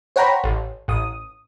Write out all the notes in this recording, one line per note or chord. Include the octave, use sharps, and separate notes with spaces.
C5 C#5 F#5 G5 A#5 B5
A1
A1 D#6